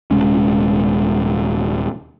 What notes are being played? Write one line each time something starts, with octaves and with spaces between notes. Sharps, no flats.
D#1 C3 G#3 C#4